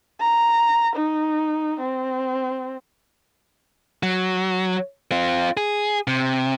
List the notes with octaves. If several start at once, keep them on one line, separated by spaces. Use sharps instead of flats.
A#5
D#4
C4
F#3
C4 F4
G#4
C3